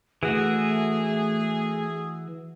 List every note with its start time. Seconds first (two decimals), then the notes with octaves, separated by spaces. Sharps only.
0.23 E3 A3 F#4 G#4